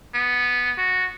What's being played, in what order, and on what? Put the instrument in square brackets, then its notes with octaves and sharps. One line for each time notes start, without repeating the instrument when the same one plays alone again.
[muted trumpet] B3
F#4